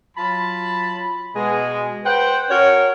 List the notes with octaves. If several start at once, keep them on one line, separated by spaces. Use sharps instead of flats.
F#3 F4 A5 B5
B2 G#3
B4 C5 F#5 G5
C#4 F#4 A#4 C#5